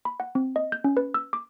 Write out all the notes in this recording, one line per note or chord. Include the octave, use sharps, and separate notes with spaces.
B5
F#5
C4
D#5
G6
C#4
B4
E6
D6